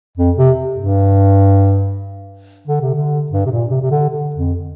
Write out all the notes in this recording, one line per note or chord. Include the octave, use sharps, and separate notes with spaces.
F2
C3
G2
D3
C3
D3
G2
C3
A#2
C3
C3
D3
D3
F2